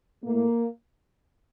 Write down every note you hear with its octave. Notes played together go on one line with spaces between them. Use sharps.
A2 A3 A#3